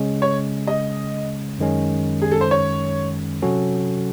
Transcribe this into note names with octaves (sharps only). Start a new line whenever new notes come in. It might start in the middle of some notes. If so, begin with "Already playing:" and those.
Already playing: C#3 G#3 C#4
C#5
D#5
F#2 D#3 G#3 C#4
G#4
A4
C5
C#5
C3 F#3 C#4 F#4 A4